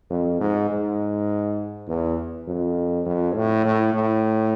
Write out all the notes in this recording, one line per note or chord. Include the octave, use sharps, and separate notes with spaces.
F2
G#2
G#2
E2
F2
F2
A2
A2
A2